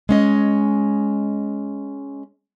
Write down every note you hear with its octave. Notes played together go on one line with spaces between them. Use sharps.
G#3 C#4 D#5